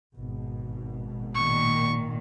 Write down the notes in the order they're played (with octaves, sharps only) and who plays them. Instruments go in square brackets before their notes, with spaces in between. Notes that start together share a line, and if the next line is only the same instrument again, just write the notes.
[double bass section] G#1 B2
[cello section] A#2 D#3 [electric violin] C#6